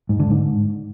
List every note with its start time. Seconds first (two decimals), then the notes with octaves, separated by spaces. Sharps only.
0.09 G#2
0.20 D3
0.30 G#2